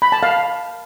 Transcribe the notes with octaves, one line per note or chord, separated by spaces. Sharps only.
B5
A5
F5